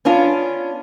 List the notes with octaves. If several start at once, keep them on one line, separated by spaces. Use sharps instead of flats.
B3 C#4 D4 F4